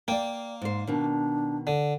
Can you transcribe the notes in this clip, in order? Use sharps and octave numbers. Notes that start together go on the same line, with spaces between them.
A#3 D5 G5
G#2 C5
B2 D#3 D4
D3